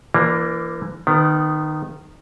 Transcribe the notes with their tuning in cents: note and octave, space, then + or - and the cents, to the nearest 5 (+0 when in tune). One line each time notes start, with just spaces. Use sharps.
E3 +30 A#3 +0 D4 +0
D#3 -20 B3 +15